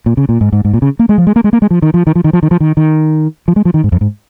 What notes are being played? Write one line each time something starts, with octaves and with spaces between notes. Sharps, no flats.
A#2
C#3
A#2
G#2
G#2
G#2
A#2
C#3
A#3
G#3
F3
G#3
A#3
G#3
A#3
G#3
F3
D#3
F3
D#3
F3
D#3
F3
D#3
F3
D#3
D#3
F3
G#3
F3
D#3
G#2
F2
G#2